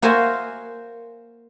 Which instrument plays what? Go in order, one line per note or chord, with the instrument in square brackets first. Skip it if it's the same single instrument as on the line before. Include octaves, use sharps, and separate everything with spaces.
[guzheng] A#3 F#4 C5 E5 F5 G#5